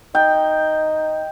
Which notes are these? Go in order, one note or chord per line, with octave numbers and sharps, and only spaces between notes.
D#4 G5